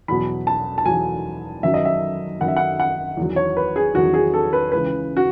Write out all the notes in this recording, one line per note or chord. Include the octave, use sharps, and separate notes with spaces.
E2 B2 F#3 B5
A5
A5
E2 B2 F#3 G#5
F#2 D#3 F#3 E5
D#5
E5
F#2 D#3 F#3 F#5
E5
F#5
F#5
E2 D#3 F#3
C#5
B4
G#4
E2 D#3 F#3 F#4
G#4
A4
B4
C#2 C#3 E3 B4
F#4